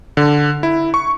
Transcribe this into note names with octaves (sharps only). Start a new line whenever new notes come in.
D3
E4
C#6